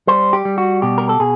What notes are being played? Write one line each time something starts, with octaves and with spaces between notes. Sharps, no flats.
G3 C5
G4
G3
F#4
B2 G4
A#4
A4
B2 G#4